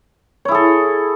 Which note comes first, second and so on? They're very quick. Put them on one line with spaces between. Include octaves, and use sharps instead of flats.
C#5 E4 G#4 A4